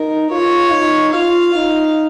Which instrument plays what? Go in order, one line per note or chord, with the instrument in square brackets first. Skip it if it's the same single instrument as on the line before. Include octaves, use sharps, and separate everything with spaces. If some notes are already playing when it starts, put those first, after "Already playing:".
Already playing: [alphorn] D#4 [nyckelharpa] A#4
[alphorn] F4 [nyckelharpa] C#5
[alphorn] D#4
[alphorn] F4 [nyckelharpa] F5
[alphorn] D#4